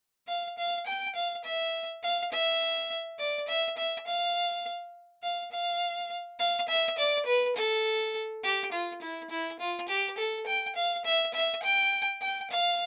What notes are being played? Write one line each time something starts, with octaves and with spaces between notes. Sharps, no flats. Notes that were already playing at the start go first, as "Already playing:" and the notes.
F5
F5
G5
F5
E5
F5
E5
D5
E5
E5
F5
F5
F5
F5
E5
D5
B4
A4
G4
F4
E4
E4
F4
G4
A4
G5
F5
E5
E5
G5
G5
F5